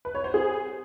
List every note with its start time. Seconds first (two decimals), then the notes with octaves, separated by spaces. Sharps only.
0.05 B4
0.15 C#5
0.24 C5
0.34 G#4